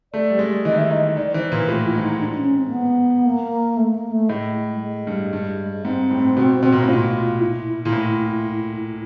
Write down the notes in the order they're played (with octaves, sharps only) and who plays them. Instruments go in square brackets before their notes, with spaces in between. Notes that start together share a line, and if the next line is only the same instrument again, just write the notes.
[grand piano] A3 [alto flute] D5
[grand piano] G3
G#3
[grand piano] E3 [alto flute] D#5
[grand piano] D#3
[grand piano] E3 [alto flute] E5
[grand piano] D#3 [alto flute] D#5
[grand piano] D#3 [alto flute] D5
[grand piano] E3 [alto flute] C5
[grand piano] A#2 [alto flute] B4
[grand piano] A2 [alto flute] F4
[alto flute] E4
[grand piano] G#2
[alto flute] D#4
D4
C#4
C4
A#3
B3
A#3
A3
A#3
A3
[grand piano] A2 [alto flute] G#3
[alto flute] G#3
[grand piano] G2
G2
[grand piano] G#2 [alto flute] C4
[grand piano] A2
B2
B2
A#2
A2
[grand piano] A#2 [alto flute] F4
[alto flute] E4
[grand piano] A#2
A2